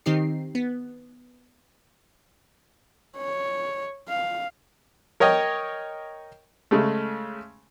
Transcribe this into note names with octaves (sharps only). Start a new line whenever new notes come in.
D#3 C4 D#4 G4 C7
B3
C#5
F5
A#4 C#5 D#5 G5
C#3 G#3 A3